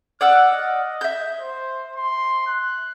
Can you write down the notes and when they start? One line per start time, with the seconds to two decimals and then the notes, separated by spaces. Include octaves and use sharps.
0.21 D5 F#5 E6 F6
0.52 D#5
1.01 E5 G6
1.40 C5
1.96 C6
2.47 F#6